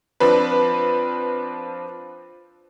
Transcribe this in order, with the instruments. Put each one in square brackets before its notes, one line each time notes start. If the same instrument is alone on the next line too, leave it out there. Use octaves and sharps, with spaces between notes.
[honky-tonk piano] F3 C4 D4 B4